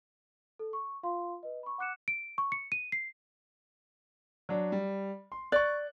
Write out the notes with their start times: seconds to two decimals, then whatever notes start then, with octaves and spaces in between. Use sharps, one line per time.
0.59 A4
0.73 C#6
1.03 F4 F5 C6
1.43 B4 D#5
1.63 B5 C#6
1.78 F#5 D6 F#6 C#7 E7
2.08 D7
2.38 C#6
2.52 C#7
2.72 D#7
2.92 C7
4.49 F#3 D4
4.72 G3
5.32 C6
5.52 D5 C#6 F#6